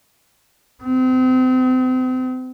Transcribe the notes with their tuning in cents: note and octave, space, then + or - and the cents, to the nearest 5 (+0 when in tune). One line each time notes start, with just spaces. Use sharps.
C4 -35